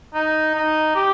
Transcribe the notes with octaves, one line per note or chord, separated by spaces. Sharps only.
D#4
D#4
G4